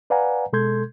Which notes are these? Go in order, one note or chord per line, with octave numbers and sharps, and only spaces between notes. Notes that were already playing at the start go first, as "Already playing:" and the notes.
B4 D5 F5 F#5 G#5 A#5
B2 G#3 A4 C6 G6 G#6